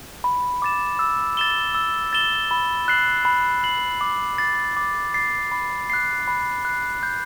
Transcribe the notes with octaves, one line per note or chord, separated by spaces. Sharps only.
B5
D6 A6 E7
E6
A6 E7 G7
E6
A6 E7 G7
B5
F#6 C7 F#7
B5
F#6 C7 F#7
D6
A6 C7
D6
A6 C7
B5
F#6 C7
B5
F#6 C7
G6